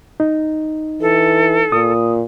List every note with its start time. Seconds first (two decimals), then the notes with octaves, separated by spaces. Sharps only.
0.20 D#4
1.01 E3 A4
1.72 A#2 D#6